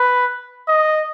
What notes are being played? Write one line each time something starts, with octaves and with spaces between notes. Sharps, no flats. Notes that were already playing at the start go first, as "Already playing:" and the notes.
Already playing: B4
D#5